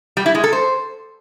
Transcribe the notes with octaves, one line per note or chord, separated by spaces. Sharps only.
G3
E4
G#3
A4
C5